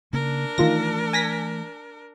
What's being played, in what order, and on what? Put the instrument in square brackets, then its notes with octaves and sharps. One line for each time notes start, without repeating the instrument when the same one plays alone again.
[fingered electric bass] C#3 A#3 [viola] D4 A#4
[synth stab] D#3 F4 A#6 [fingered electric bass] E3 A3
[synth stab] G#5 A#6 B6